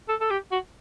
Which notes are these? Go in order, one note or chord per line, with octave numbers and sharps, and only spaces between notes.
A4
A4
G4
F#4